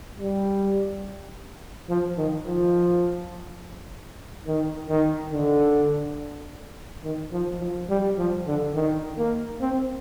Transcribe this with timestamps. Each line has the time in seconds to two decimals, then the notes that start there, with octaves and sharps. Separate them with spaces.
0.18 G3
1.89 F3
2.18 D#3
2.47 F3
4.47 D#3
4.89 D#3
5.33 D3
7.04 D#3
7.33 F3
7.60 F3
7.89 G3
8.18 F3
8.47 D3
8.75 D#3
9.18 A#3
9.61 C4